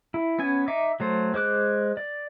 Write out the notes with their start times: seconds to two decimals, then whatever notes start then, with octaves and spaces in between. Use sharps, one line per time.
0.14 E4
0.39 B3 C#4 G#5
0.68 D#4 E5 D6
1.00 F#3 A3 C5
1.34 G#3 C5 D6 F#6
1.97 D5